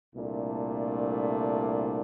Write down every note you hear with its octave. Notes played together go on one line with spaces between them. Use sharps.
C2 A#2 A3 D4